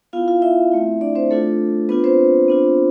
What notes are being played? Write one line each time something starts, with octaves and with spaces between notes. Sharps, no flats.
B3 E4 F4 F5
F4 F5
E4 E5
A3 C4 E4
D4 D5
C4 C5
A3 D4 F4 A4
B3 D4 F4 B4
C4 C5
B3 D4 F4